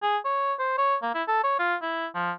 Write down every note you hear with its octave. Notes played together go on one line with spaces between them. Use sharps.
G#4
C#5
C5
C#5
A#3
E4
A4
C#5
F4
E4
F3